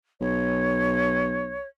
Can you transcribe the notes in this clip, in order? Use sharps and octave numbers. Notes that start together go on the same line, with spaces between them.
B1 C#5